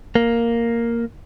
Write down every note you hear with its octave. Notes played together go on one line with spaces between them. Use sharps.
A#3